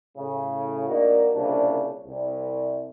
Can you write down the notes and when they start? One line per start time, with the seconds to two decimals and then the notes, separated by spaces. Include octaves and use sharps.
0.16 A2 C#3
0.88 A#3 D4 D#4 F#4
1.33 C2 A#2 C#3 D4
2.05 C2